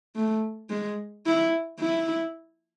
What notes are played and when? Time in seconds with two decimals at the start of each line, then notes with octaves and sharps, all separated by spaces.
0.16 A3
0.70 G#3
1.26 E4
1.80 E4